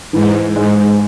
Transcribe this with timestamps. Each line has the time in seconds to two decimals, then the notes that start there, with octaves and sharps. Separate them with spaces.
0.12 G#2 E3
0.56 G#2 G#3